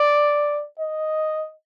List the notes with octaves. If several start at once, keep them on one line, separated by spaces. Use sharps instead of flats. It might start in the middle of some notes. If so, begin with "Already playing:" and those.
Already playing: D5
D#5